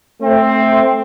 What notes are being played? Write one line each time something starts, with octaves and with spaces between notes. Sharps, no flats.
A3 C4